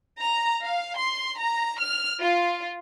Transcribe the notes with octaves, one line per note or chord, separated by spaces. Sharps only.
A#5
F5
C6
A#5
F6
F4